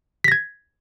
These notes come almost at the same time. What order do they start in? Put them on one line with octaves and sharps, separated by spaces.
B6 A#6 G#6